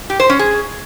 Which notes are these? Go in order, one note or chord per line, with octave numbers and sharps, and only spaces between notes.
G4
C5
C#4
G#4